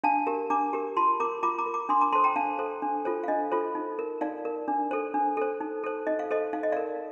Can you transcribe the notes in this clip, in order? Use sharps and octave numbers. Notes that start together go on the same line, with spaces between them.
D4 F5 A5
G4 A#4
D4 A#5 D6
G4 A#4
F4 A5 C6
A#4 A#5 D6
F4 A#5 D6
A#5 D6
A#4
A#5 D6
D4 C6 D#6
A#5 D6
A4 C5 A5 C6
G5 A#5
D4 F5 A5
A4 C5
D4
F4 A4 C5
F5
D4 D#5
F4 A4 C5
D#4
A#4
D#4 D5 F5
A#4
D4
A4 C5
D4
A4 C5
D#4
A4 C5
D#4 D#5
F5
A4 C5 D#5
D#4 F5
D#5
A#4 D5 F5